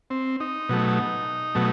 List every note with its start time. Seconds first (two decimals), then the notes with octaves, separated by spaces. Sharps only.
0.10 C4
0.40 D#4
0.69 B2 F#3 A3
1.55 B2 F#3 A3